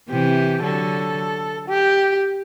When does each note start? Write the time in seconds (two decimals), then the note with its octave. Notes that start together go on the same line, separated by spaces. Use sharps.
0.10 C3 E3 G4
0.63 D3 F#3 A4
1.68 G4